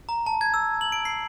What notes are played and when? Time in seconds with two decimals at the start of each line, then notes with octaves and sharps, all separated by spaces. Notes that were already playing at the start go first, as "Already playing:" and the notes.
0.09 A#5
0.26 A5
0.41 G#6
0.54 E6
0.81 F#7
0.92 D7
1.05 C7